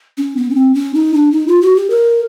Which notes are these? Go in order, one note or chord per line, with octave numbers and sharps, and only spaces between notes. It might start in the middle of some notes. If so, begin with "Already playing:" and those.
C#4
B3
C#4
C4
C#4
D#4
D4
D#4
F4
F#4
G4
A#4